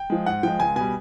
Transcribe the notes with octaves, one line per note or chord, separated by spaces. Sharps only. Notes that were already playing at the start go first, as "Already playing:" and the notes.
Already playing: G5
F3 G#3
G#2 F#5
F3 G#3 G5
C#2 G#5
B2 G3 G#5